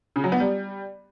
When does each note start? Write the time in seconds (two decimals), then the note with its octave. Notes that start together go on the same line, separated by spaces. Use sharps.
0.16 C#3
0.24 F#3
0.32 B3
0.40 G3